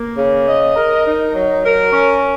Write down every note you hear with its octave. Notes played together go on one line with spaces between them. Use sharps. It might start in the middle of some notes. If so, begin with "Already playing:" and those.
Already playing: A#3
C#3
D#5
A#4
D#4
F#3
A#4
C#4